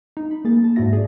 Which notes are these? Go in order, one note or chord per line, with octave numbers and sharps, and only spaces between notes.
D#4
B5
A#3 G#4 A6
A5
G#2 D4 E4 F#4 E5 A#6
G#4 D5